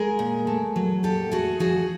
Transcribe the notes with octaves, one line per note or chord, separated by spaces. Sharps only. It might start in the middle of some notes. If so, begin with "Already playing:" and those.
Already playing: G#3 G#4 A#4
A#2
A3
F#3
A#2 G4 A4
A3 F#4 G#4
F3 F#4 G#4